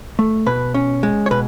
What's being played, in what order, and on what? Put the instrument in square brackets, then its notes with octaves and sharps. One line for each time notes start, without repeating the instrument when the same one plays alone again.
[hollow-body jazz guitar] A3
B2 B4
C#4
G#3
C#5
B2 B4